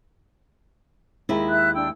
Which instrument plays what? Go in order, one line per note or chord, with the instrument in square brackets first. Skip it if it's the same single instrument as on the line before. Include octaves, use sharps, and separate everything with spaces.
[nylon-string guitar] D#2 G#3 E4
[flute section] E5 F#6
D4 G5 E6